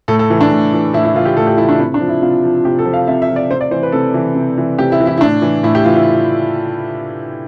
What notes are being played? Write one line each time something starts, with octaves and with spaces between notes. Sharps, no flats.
A2 A4
A4
E3
D4
A2
E3
A2 E4
E4
E3 F4
G4
A2 A4
G4
E3 E4
D4
C3 E4
D4
F3
E4
C3 F4
F3
C3 G4
A4
F3
F5
C3 E5
E5
F3
D5
C3 C5
D5
E3 C5
B4
C3 A4
E3
C3
E3
C3 G4
E4
E3
E4
E4
A2 D4
E3
A2 E4
G4
E3 F4
E4